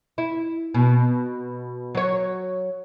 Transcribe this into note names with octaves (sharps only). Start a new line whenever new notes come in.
E4
B2
F#3 C#5